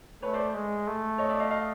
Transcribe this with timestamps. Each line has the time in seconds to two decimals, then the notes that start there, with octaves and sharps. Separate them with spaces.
0.22 A3 B4 C#5
0.33 C5 D5
0.55 G#3
0.87 A3
1.18 C#5 D#5
1.29 D5 E5
1.40 D#5 F5
1.51 D#5 F5